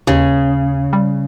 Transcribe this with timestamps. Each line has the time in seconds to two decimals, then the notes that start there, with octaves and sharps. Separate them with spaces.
0.07 D#2 C#3
0.93 G3